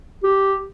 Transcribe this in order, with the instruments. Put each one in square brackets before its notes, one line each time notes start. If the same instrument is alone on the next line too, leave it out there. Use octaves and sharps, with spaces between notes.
[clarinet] G4